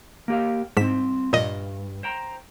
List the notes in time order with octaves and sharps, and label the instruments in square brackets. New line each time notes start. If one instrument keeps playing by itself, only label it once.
[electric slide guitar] A#3 G4 F5
[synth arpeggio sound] G#2 B6 E7 [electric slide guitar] G3 C4
[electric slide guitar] E2 G2 [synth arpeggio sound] A#2 D#5
[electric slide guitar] C5 G5 A#5